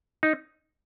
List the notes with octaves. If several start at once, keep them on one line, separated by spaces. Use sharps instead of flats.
D#4